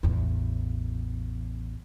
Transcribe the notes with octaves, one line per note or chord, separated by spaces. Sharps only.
A1 E2